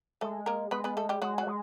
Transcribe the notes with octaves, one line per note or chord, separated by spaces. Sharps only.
G#3 A3 A4
A#3 A#4
G#3 B3 B4
B3 B4
A3 A4
G3 G4
F#3 G#3 F#4
F#3 F#4
G#3